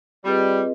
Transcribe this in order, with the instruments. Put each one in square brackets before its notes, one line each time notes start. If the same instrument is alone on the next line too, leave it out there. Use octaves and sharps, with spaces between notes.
[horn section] G3 [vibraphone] C4 F4 G#4 B4 D#5